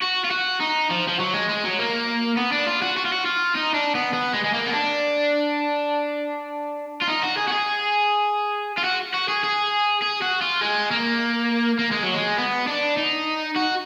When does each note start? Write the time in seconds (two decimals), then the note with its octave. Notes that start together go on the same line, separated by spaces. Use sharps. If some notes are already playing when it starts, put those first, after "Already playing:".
0.02 F#4
0.25 F4
0.31 F#4
0.61 D#4
0.90 F3
1.08 F3
1.19 F#3
1.34 G#3
1.49 G#3
1.64 F#3
1.79 A#3
2.37 B3
2.52 D4
2.67 F4
2.82 F#4
2.97 F#4
3.05 F4
3.12 F#4
3.25 F4
3.55 D#4
3.74 D4
3.95 B3
4.13 B3
4.34 G#3
4.44 G#3
4.54 A#3
4.67 B3
4.73 D4
7.01 F4
7.08 D#4
7.23 F#4
7.37 G#4
7.48 F#4
7.52 G#4
8.78 F4
8.84 F#4
9.14 F#4
9.28 G#4
9.44 G#4
10.02 G#4
10.22 F#4
10.41 F4
10.61 G#3
10.91 A#3
11.79 A#3
11.91 G#3
12.03 F#3
12.14 G#3
12.38 B3
12.67 D4
12.97 D#4
13.56 F#4